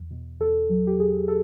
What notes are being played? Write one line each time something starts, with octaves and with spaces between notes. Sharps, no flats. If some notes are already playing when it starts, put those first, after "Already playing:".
Already playing: E2
B2
E2 A4
F#3
G4
E2 G#4
A4